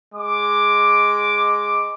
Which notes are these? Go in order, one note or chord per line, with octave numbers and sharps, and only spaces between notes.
G#3 D6